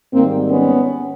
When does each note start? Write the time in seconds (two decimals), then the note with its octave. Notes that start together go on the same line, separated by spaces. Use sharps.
0.13 G#2 D#3 G3 A#3 C4
0.49 B3 C#4